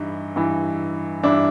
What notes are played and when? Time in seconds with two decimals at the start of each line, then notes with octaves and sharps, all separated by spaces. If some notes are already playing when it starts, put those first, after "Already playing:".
Already playing: G2 E3 D#4 E4
0.36 G2 E3
1.23 G2 E3 D4 E4